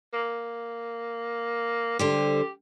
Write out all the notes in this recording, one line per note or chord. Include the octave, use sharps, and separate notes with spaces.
A#3
D3 G3 G4 C5